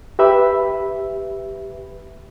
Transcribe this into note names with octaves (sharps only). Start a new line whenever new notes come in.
G4 B4 E5 B5